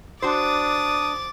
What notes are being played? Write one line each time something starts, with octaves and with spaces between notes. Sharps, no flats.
D4 F#4 C5 D6 D#6 A6